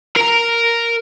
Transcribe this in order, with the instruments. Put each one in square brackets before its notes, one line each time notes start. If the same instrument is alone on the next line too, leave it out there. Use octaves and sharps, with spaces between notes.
[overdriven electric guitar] A#4 A#5